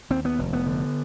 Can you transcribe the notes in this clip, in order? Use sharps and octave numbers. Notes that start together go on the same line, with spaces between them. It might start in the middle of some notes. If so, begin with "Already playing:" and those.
D#2 C4
B3
F1
B3
D3